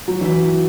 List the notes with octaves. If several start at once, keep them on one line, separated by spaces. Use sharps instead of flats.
F#3
E3